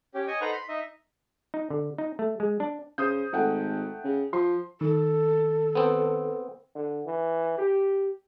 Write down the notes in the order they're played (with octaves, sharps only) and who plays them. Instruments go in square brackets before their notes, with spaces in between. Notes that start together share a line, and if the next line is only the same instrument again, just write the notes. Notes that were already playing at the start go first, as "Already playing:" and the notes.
[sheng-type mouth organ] C#4 G4
C#5 D#5 G#5 D#6
D#4 A4 B4 C5 F#5 A#5
B5 C6
D#4 D#5 E5
[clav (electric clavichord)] D#4
D3
D#4
A3
G#3
D4
[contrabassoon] C#3 [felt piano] C5 D#6 G6
[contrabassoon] G#1 [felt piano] A3 F#5 G5
[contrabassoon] C#3
[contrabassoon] F3 [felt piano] C6
[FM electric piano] D#3 [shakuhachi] A4
[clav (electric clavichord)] B3 C4
[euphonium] D3
E3
G4